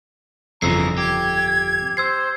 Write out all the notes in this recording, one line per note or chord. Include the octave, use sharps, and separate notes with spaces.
G1 F2 C#3 E3 A#5 E6 C7
G4 G#6
C5 E6 G#6 C7